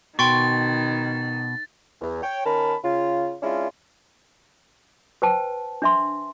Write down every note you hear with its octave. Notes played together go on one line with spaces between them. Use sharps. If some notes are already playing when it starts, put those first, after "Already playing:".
B2 D#3 G5 C6 C#6 A6
E2
C#5 G5
D#3 C#4 A#4 A5 B5
C#3 F4
G#3 C#4 D4 E4 F4
B4 C5 G5 A5
D4 E5 C6